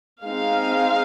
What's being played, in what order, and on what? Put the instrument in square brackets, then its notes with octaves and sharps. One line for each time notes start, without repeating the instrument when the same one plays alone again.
[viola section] G#3 C4 D#4 F5